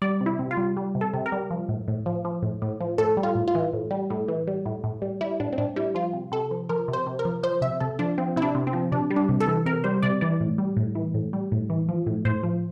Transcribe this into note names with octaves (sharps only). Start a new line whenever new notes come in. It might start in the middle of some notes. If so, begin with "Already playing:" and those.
G3 D5
C3
E4
C3
F4
G3
G3
C3
A4
C3
A#4
G3
F3
A2
A2
F3
F3
A2
A2
F3
A2 A4
G3
F4
A2
F4
E3
A2
G3
A2
E3
G3
A2
A2
G3
G3 E4
A2 D4
C4
A2 D4
G3 E4
F3 F4
C3
C3 A4
F3
F3 A#4
C3
C5
C3
A#4
F3
F3 C5
C3 E5
C3 A4
F3 D4
F3 C4
C3 E4
D4
C3
C4
F3
C3 D4
G3
D4
C3
A4
E3
C3 A#4
G3 C5
C3 D5
E3 D5
A2
G3
A2
E3
A2
G3
A2
E3
F3
A2
A2 C5
F3